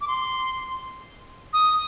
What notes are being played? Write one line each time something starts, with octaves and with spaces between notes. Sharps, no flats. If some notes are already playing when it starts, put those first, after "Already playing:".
D6
C6
D#6